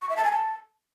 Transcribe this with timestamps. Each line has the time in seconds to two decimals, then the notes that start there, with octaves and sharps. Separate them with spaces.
0.02 C#6
0.09 E5
0.17 A5
0.24 G#5
0.32 A5